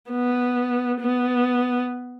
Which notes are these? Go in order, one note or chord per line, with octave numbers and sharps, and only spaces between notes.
B3
B3